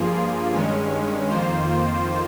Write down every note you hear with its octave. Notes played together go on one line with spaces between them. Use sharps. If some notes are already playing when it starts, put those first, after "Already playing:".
Already playing: G2 F3 A#3 F4 G#4
G2 D#3 G#3 C#4
F2 D#3 A#3 F4 C5